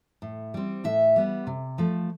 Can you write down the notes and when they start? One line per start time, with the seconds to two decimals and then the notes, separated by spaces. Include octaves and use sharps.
0.22 A2
0.54 G3 C4
0.84 A2 E5
1.16 G3 B3
1.47 C3
1.78 F3 A3